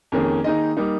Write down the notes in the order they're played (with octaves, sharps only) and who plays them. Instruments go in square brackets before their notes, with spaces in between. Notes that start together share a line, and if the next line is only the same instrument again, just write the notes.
[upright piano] F2 D#3 A#3 C#4 G#4
D#3 A#3 D#4 G#4 D#5
G3 A#3 D#4